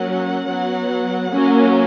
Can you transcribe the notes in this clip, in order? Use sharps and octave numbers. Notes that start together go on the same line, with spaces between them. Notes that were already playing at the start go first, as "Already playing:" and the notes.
Already playing: F#3 A#3 C#4 F#5
F#3 B3
F#3 A#3 C#4